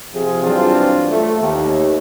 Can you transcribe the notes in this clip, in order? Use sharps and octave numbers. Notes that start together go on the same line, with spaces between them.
C3 F3 F4 G#4
G2 E3 F#3 C4 D4 F4
A3
D#2